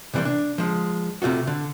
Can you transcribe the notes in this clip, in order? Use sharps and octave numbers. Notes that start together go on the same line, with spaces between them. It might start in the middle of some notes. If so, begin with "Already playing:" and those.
C3 E3 F#3 G3 A#3
D4
F3 G#3
C3 A3 F4 F#4
D3